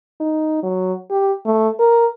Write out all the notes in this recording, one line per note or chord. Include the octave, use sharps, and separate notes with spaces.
D#4
F#3
G4
A3
A#4